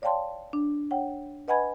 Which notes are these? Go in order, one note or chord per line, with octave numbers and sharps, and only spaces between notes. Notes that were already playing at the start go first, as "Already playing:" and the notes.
C#5 D5 F5 G5 A5 C6
D4
C#5 F#5 G5
B4 D#5 F#5 G#5 B5 G#6